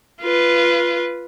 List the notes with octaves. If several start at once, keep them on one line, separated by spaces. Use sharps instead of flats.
F4 B4